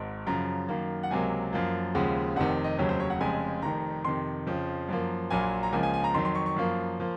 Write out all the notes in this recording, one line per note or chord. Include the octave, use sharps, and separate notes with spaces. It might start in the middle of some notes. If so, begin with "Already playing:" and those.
Already playing: G#1 G#2
F#2 C#3 F3 A#5
F#2 D#3 A#3
F#5
C#2 C3 F#3 A#3 G#5
F#2 F3 A#3
D#2 C#3 F3 G#3 F#5
F1 F2 C3 D#3 F#5
D#5
F1 D#2 C#3 F#3 C#5
C5
C#5
F#5
F1 F2 C#3 G#3 G#5
F1 F2 D#3 A#5
F2 C3 D#3 C6
F2 C#3 F3
F#2 F3 A#3
A#1 A#2 F#3 A#3 G#5
A#5
C#2 C#3 F3 A#3 G#5
G#5
G#5
A#5
F2 D#3 F#3 C6
C6
C#6
C#6
F#2 F3 A#3
F3 A#3